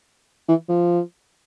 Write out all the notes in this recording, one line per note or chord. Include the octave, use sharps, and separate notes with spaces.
E3
F3